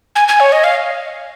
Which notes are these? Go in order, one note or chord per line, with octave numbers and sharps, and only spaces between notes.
G#5
G#5
C#5
D#5
F5